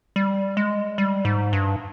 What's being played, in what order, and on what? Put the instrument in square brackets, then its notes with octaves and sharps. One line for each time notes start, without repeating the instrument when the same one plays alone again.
[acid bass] G3
G#3
G3
G#2
G2